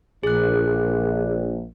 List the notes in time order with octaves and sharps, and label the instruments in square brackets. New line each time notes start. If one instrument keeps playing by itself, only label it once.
[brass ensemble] A#1 [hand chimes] G#4 F#6